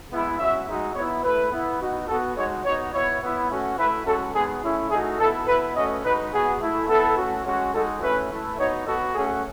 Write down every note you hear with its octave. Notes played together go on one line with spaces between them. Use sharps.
G#3 B3 E4
G#3 C#4 F#4 E5
G#3 D#4 F#4
B3 E4 C#5
A3 E4 B4
B3 E4
B3 D#4 F#4
B3 F#4 A4
G#3 D#4 F#4 C#5
B3 D#4 F#4 C#5
B3 E4 C#5
B3 E4
A3 C#4 F#4
A3 E4 B4
G#3 C#4 F#4 A4
G#3 B3 D#4 G#4
A3 C#4 E4
A3 D#4 F#4 G#4
B3 E4 A4
B3 E4 B4
A3 C#4 F#4 D#5
G#3 D#4 F#4 B4
B3 F#4 G#4
A3 E4
B3 E4 A4
A3 C#4 F#4
G#3 C#4 F#4
G#3 D#4 F#4 A4
A3 C#4 E4 B4
A3 E4
B3 D#4 F#4 C#5
B3 F#4 A4
A3 C#4 F#4 G#4